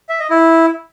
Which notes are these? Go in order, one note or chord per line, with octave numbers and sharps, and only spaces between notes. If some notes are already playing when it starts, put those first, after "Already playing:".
E5
D#5
E4